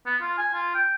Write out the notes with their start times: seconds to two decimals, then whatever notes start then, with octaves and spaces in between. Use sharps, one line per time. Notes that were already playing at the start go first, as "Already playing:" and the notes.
0.06 B3
0.21 F4
0.38 G#5
0.54 F4
0.74 G5